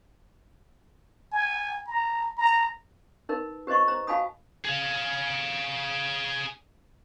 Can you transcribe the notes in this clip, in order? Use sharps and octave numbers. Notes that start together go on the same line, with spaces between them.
G#5
A#5
A#5
D#4 A#4 B4
G4 B4 C5 D#5 C#6
C5 A#5
F#4 F5 G#5 A5 B5 D#6
G#4 F5